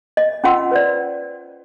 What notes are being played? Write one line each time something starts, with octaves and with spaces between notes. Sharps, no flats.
D#5
C#4 F4 F#5 C6 E6
B4 C5 D5